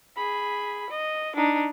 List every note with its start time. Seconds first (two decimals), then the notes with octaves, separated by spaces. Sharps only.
0.16 G#4 B5
0.90 D#5
1.36 D4 D#4